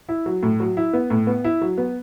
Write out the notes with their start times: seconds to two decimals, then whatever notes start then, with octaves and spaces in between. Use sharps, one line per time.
0.09 E4
0.26 F#3
0.43 A2
0.60 F#3
0.77 E4
0.93 B3
1.10 A2
1.27 B3
1.44 E4
1.61 F#3
1.78 B3